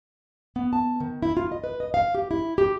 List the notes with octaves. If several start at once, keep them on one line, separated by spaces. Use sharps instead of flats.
B3
A5
D#3
E4
F4
D#5
B4
D#5
F5
G4
E4
G4